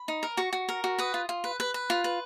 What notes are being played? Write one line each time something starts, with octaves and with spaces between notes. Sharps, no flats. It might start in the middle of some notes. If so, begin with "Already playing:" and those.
Already playing: B5
D#4
A#4
F#4 C#6
F#4
A#4
F#4
B4 D#6
F4
F4
B4
B4
B4
F4
B4